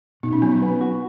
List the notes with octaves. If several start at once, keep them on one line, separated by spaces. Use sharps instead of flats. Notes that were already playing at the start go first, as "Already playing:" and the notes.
B2 D#4
C#4
F#3 B3
C#4
B3
F#4